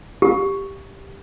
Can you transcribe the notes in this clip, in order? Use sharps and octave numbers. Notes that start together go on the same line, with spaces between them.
G4